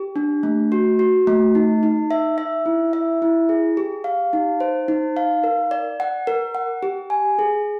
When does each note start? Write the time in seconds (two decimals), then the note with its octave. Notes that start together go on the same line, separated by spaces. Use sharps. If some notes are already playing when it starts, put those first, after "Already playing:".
Already playing: G4
0.16 D4
0.43 A3
0.72 F#4
0.99 F#4
1.27 A3
1.55 D#4
1.83 D#4
2.11 E5
2.38 E5
2.66 E4
2.93 E5
3.22 E4
3.49 G#4
3.77 G4
4.04 F5
4.33 D#4
4.60 C5
4.88 D#4
5.17 F5
5.44 A#4
5.71 D5
6.00 F#5
6.27 A#4
6.55 F#5
6.83 G4
7.10 G#5
7.39 G#4